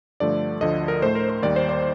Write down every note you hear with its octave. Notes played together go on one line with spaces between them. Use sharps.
G2 D3 F3 A3 D5
D2 D3 F3 D#5
A#4
A2 A3 C5
A#4
C5
D#2 D#3 G3 D5
C5
D5